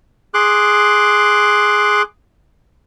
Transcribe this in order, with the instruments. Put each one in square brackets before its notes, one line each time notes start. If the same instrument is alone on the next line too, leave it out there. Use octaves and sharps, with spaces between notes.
[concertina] G#4 C6 D6 F#6